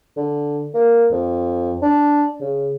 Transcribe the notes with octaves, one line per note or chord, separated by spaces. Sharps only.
D3
A#3
F2
D4
C#3